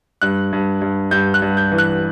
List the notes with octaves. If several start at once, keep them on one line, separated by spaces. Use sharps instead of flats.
G2 F#6
G2
G2
G2 G6
F#6
G2
G6
E3
F#6